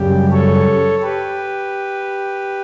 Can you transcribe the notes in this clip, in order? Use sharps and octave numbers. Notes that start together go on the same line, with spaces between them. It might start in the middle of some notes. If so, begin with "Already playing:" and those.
Already playing: F#2 C#3 G3 G4
A4 C#5
G4 B4